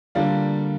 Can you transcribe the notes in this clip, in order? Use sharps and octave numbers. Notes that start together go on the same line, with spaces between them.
D3 G3 A#3 F4 D5